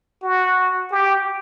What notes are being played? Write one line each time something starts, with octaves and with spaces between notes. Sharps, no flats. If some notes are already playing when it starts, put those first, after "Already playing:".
F#4
G4